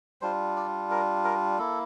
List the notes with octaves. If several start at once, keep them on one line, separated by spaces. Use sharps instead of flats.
G3 D4 F4 C5
D5
A#4
A#4
A#3 E4 A4